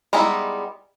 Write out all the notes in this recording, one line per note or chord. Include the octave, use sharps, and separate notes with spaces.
G3 G#3 B3 D#4 E4